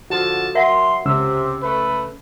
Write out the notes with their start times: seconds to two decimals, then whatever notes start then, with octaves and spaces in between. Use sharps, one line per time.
0.10 D3 F3 F#4 A5
0.55 F#3 A#4 E5 F#5 C6
1.05 C#2 C3 C#4 E6
1.63 A3 B4